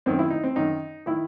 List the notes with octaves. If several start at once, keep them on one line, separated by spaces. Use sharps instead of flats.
F#2 D#3 C4
E4
D#4
C4
F#2 D#3 D#4
D#3 E4